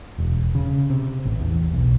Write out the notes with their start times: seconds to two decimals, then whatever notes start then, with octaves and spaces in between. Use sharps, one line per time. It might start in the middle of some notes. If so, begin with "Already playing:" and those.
0.18 E1
0.55 C#3
0.90 C3
1.25 A1
1.40 E2
1.73 B1